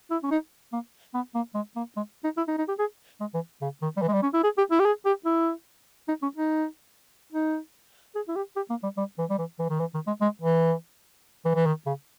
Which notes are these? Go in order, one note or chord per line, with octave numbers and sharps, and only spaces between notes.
E4
C#4
D#4
A#3
B3
A#3
G#3
A#3
G#3
D#4
E4
D#4
D#4
G4
G#4
G#3
E3
C#3
D#3
G3
E3
G#3
G3
C#4
E4
G#4
G4
E4
G4
G#4
G4
E4
D#4
C#4
D#4
D#4
G#4
E4
G4
G4
A#3
G3
G3
E3
G3
E3
E3
D#3
E3
D#3
G#3
G#3
E3
E3
E3
D#3
C#3